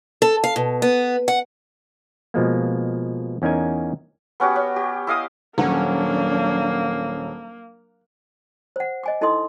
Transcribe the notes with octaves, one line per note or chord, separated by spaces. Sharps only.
A4
F5
B2
B3
F#5
B2 F3 G#3 A#3
E2 C#4 D#4 A#4 G#5
B3 C#4 F#4 G4
C#4
G4
E4 D#5 F5 D#6
D#1 F#3 A#3 C#4 D4 F#5
C5 F#5
D#5 G#5 D6
D#4 E4 A4 D#5 C6 D#6